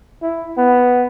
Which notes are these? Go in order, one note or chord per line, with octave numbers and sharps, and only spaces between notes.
E4
B3